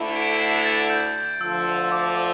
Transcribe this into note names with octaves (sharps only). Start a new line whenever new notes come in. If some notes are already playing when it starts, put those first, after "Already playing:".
Already playing: D2 D3 A3 E4
D7
C7
A6
G6
D2 D3 F3 E6
E6
D6
E6